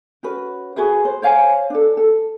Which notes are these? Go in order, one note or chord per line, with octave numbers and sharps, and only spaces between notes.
C#4 F#4 B4
F#4 G#4 B4 E5
C5
C5 C#5 F5 G#5
D4 A4
A4